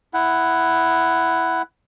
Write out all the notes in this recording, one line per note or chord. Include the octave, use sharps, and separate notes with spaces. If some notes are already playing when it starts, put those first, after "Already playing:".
E4 F#5